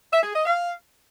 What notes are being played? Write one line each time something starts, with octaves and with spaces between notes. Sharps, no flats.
E5
G#4
D#5
F5